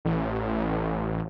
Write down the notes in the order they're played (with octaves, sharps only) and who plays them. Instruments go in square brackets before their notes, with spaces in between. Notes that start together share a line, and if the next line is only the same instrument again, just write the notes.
[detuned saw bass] A1